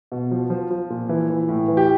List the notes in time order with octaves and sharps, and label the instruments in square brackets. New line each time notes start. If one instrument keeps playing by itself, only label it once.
[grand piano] B2
F3
F3
F3
A#2
E3
E3
A2
E3
G4